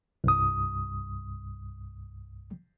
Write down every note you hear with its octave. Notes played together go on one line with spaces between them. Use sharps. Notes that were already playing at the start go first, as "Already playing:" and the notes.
C2 G2 D#6